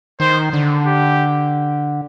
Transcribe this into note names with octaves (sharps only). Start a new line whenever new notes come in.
D#3 C5
D3
G4